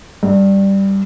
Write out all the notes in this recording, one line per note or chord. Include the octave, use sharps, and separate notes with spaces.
G2